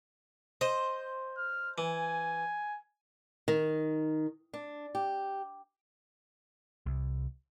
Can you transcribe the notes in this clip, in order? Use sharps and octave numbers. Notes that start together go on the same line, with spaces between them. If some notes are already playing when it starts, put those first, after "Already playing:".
C5 D#5
F6
E3 G#5
D#3
D4
G4
C2